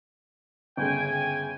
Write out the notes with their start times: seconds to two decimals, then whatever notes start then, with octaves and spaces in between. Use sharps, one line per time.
0.77 G1 C#3 G5 G#5